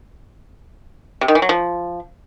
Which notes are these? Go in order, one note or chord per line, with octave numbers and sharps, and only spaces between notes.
C3
D#3
E3
F#3
F3